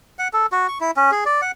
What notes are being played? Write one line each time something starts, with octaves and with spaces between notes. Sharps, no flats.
F#5
A4
F#4
C#6
E4
C#4
G#4
D5
F#5